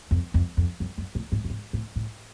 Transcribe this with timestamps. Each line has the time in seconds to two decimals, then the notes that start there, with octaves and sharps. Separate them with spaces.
0.11 F2
0.34 F2
0.57 F2
0.80 F#2
0.98 F#2
1.15 A2
1.32 G#2
1.44 G2
1.50 G#2
1.73 A2
1.96 A2